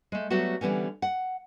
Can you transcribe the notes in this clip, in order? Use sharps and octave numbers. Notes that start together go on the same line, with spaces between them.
G#3 A3
F#3 G3 A3 B3 F#4
D3 E3 G3 B3 C#4
F#5